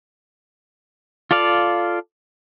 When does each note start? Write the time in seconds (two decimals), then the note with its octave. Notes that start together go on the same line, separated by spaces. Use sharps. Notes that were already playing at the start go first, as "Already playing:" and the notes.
1.31 F4 A4 D5 F5